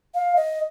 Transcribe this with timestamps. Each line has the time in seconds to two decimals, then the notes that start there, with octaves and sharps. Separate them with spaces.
0.15 F5
0.36 D#5